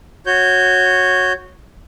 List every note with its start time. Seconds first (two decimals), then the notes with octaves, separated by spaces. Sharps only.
0.26 F#4 C#5 G6